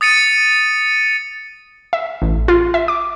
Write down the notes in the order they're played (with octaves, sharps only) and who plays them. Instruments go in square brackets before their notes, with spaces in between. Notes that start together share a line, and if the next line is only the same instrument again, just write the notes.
[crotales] D#6 A6 C#7 D#7
[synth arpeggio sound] E5
A1
F4
E5
D6